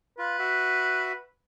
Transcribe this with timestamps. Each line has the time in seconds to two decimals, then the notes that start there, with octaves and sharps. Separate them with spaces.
0.18 F4 B4
0.39 F#4 E5